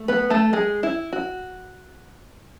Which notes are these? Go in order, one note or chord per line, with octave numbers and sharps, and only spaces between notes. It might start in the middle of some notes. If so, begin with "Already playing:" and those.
Already playing: A3
B3 B4
A3 A4
G#3 G#4
E4
F#4